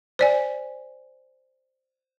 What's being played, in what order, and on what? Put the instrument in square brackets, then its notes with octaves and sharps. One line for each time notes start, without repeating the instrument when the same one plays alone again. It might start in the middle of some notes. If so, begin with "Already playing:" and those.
[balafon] C5 D5 G#5